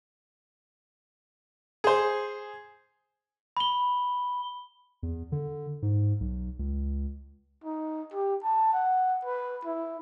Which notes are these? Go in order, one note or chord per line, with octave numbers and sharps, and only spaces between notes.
G#4 C5
B5 G7
E2
D3
G#2
B1
C#2
D#4
G4
A5
F#5
B4
E4